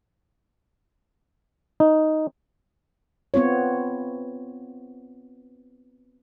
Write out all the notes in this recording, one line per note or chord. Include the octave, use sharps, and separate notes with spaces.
D#4
B3 C4 F4 C#5